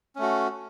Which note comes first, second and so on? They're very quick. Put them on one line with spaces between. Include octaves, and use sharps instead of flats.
C#4 A3 F#4